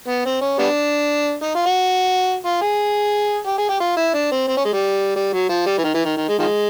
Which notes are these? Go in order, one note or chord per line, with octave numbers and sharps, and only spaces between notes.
B3
C4
C#4
G3 B3 D4
D#4
F4
F#4
F4
G#4
G4
G#4
G4
F4
E4
D4
C4
C4
C#4
G#3
G3
G3
F#3
F3
G3
E3
D#3
E3
D#3
D#3
G#3
D#3 F3 G#3